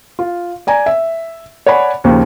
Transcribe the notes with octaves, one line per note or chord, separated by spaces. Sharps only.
F4
D5 G#5 A#5
E5
C#5 D5 F#5 G#5 B5
D#2 C#3 F3 A#3